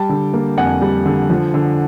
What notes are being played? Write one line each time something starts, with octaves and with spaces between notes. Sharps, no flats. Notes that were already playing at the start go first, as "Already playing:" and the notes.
Already playing: G3 G5 A5
D3
A#3
F2 F#5 G#5
G3
D3
F3
D3